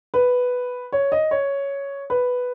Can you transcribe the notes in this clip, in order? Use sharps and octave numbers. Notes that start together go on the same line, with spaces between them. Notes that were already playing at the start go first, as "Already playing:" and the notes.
B4
C#5
D#5
C#5
B4